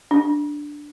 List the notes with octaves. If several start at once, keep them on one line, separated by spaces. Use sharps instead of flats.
D4